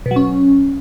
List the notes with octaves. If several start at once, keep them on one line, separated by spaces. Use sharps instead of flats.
B2
F#3
C#4